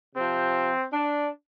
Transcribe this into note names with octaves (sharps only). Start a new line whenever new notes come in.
C3 F3 C4
D4